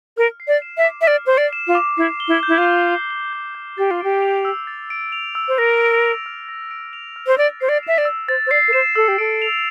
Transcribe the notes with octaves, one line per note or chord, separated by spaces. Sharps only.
A#4 F6
C7
D5
E7
E5
D6
E5
D5 F6
C5 C7
D5
E7
F4
D6
E4 C7
G7
E4
G6
E4
F4
G6
C7
G7
G6
G6
G4 A6
F4
G4 D7
F7
E6
A6
D7
F7
E6
C5
A#4 A#6
D7
F7
F6
A#6
D7
F7
F6
C5
D5 A6
C5 C7
D5
E5 E7
D5
E6
C5 A6
C5
D5 C7
A#4
C5 E7
A4 E6
G4
A4 D7
F7